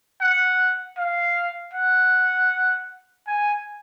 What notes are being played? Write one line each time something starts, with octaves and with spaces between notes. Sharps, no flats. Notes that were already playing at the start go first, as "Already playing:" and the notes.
F#5
F5
F#5
G#5